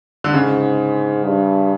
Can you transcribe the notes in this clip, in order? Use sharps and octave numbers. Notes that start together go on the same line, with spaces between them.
D3
G#2 C#3
G2